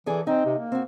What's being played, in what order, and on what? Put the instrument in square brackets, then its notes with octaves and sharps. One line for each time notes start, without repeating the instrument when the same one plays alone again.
[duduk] E3 [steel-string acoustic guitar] G#4 A4 D5
[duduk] C4 [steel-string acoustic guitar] D#4
[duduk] C3
A#3
[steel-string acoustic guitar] C4 F#4